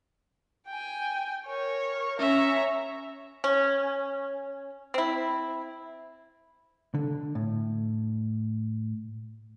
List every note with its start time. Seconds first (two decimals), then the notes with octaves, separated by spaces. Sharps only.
0.67 G5 G#5
1.46 A#4 C#5
2.20 C#4 C#5 E5 A#5
3.44 C#4
4.94 C4 E4
6.95 D3
7.35 A2